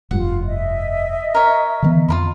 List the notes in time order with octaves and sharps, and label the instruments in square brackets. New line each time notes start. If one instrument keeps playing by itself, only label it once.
[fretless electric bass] F1 G2 [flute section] F4 [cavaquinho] F#5
[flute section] D#5 E5
[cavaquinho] A#4 C#5
[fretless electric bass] D3 E3 B3
[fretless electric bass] F2 [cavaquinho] F4 A#4 B5